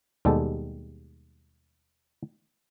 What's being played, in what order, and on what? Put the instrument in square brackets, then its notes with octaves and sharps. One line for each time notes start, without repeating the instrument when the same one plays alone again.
[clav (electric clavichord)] D#2 B2 G3 G#3 G4 A4